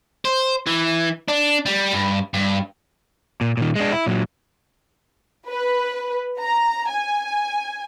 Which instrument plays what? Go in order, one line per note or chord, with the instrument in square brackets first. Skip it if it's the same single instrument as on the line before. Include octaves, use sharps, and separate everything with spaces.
[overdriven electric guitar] C5
E3
D4
G3
G2
G2
A#2
A#2 D#3
G#3 D4
E4
A#2 F#3
[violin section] B4
A#5
G#5